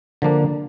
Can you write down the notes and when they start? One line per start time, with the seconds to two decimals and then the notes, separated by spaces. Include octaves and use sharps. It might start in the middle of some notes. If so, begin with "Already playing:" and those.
0.22 D3 F3 A#3 D4